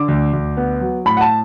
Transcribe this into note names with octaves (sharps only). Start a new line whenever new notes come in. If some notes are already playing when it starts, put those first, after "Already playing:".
Already playing: D3 D6
D2
D2
B3
F#3
A2 B5
F#5
A5